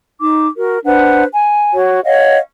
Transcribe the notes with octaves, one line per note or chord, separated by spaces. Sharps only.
D#4 D6
F#4 A#4
D4 B4 C5 F#5
G#5
F#4 C#5
C#5 D#5 F5 F#5